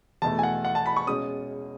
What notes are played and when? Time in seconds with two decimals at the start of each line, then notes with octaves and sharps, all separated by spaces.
0.22 E2 B2 A3 A5
0.39 G#5
0.43 F#5
0.65 F#5
0.75 A5
0.86 B5
0.96 C#6
1.07 B2 G#3 C#4 D#6